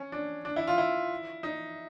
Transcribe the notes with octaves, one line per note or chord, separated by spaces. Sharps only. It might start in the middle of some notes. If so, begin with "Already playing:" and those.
Already playing: C#4
D4
D4
E4
F4
E4
D#4